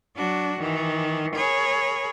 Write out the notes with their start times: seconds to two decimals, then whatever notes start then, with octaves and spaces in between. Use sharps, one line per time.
0.14 F#3 D4 F#4
0.58 D#3 E3
1.35 G#4 A#4 C#5 B5